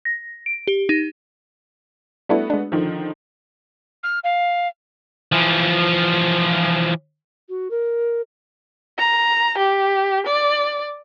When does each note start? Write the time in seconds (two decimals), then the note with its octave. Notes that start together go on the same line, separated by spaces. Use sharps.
0.05 A#6
0.46 D7
0.67 G4
0.89 D#4
2.29 G3 A3 B3 D4 E4 F#4
2.50 G#3 D4
2.72 D3 D#3 F3
4.04 F6
4.24 F5
5.32 E3 F3
7.49 F#4
7.71 A#4
8.98 A#5
9.58 G4
10.27 D5